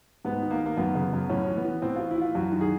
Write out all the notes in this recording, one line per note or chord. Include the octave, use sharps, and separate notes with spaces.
G#2 B3
D#3
A#3
D#3
A#3
F#2 B3
C#3
F#2
A2 C#4
E3
B3
E3
A2 C4
E3 F4
E4
E3 F4
F#2 F#4
D#3
G#4